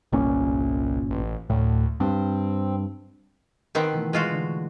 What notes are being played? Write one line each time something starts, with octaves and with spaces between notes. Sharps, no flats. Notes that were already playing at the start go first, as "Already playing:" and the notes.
G1 C2 A#2 C#4
A1
D2 A2
G2 C4
D#3 B3 C4
B2 E3 A3
G#3 F4 F#4
D3